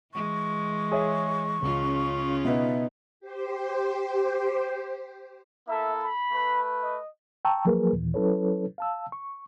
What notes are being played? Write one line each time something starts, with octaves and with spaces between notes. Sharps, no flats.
E3 G#3 C#6
G#4 C#5 E5
C#2 C#3 C#4 F4
B2 B3 D#4 E5
G4 C5
A#3 E4 A4 E5
B5
A3 B4
D#5
G5 A5 A#5 C#6 E6
F3 F#3 A#3 G#4 A#4 B4
D#2 A#2 E3
F#3 C#4 E4 A4 B4 C#5
F5 A5 E6
C#6